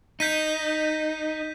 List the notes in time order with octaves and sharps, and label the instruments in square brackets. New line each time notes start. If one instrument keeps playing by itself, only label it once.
[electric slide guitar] D#4 [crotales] G6 B6 D#7